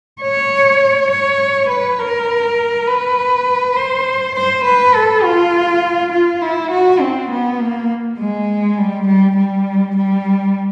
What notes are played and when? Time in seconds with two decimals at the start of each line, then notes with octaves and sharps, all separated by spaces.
0.21 C#5
1.10 C#5
1.69 B4
1.99 A#4
2.88 B4
3.76 C5
4.35 C5
4.64 B4
4.94 A4
5.23 F4
6.12 F4
6.42 E4
6.71 F#4
7.00 C4
7.30 B3
7.60 A#3
8.19 G#3
8.78 G3
9.07 G3
9.37 G3
9.96 G3